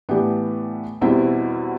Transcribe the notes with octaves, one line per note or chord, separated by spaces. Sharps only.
A2 E3 B3 D4 G4
E2 B2 G3 C4 E4